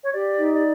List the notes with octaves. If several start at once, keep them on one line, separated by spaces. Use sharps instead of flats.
C#5
G4 D5
D#4
D5